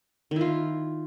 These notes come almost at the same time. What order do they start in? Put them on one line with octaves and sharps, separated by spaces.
D#3 E4 F4